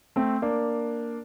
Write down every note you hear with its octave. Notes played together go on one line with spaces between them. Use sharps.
A3 C4
A#3 D4